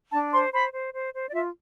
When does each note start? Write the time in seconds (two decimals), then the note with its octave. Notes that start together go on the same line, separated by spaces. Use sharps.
0.12 D4 A5
0.32 C5 C6
0.52 C5 B5
0.73 C5
0.93 C5
1.13 C5
1.29 D5
1.33 F4 E5